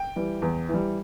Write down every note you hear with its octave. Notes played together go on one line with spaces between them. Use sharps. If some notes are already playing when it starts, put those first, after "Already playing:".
Already playing: G5
E3 G3
E2
E3
G3